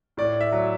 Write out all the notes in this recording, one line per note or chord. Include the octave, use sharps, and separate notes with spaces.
A2 D5
E5
F#3